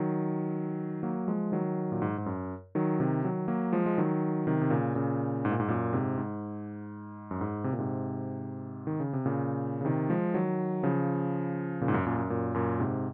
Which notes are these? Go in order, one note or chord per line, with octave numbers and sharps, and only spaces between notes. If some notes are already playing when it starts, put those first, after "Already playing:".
Already playing: D#3 F#3
F#3 A#3
F3 G#3
D#3 F#3
A#2
G#2
G#2
F#2
D#3 F#3
C3 D#3
D#3 F#3
F#3 A#3
F3 G#3
G#3
D#3 F#3
C3 D#3
C3
A#2 C#3
A#2 C#3
G#2
A#2
G#2
F#2 A#2
G#2 C3
G#2
F#2
G#2
C3
A#2
G#2 C3
D#3
C#3
C3
A#2 C#3
C#3
C3 D#3
F3 G#3
D#3 F#3
C#3 F3
A#2 C#3
G#2
F#2
F#2 A#2
F#2
F#2 A#2
F#2 A#2
G#2 C3